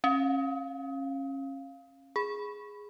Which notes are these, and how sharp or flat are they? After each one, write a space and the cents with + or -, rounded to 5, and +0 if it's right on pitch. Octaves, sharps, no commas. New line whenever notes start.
C#4 -30 F5 +0
G#4 +0 B5 +0